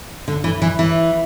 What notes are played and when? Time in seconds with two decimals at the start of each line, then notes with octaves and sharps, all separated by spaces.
0.28 D3
0.44 E3
0.62 E3
0.79 E3